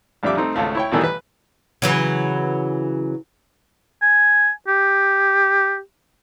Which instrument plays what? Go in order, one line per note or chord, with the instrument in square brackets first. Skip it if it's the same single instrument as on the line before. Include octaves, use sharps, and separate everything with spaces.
[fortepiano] A#1 F2 G3 D4 E5 D6
A3 C4 D#4
G#1 C#2 A3 F5
E4 C#5 G5
A1 B2 D#3 E3 G3 A4
B4
[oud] C#3 E3 F#3
[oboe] G#5
G4